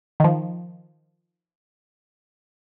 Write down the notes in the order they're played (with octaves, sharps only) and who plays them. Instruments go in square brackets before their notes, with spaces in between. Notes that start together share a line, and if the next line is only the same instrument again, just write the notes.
[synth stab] D#3 F3